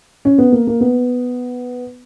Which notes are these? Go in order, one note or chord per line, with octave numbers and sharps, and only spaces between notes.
C#4
B3
A#3
A#3
B3